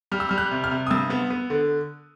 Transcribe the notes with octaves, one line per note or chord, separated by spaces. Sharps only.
G3 F6
E6
G3 F6
F#6
C3
F6
C3
D#6
G2 E6
B3
B3
D3